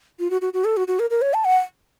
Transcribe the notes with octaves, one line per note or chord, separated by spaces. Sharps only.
F4
F#4
F#4
F#4
A4
F#4
F#4
A#4
A#4
C#5
A5
F#5